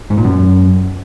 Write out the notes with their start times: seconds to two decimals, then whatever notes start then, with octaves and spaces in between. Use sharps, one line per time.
0.10 G#2
0.17 A#2
0.25 F#2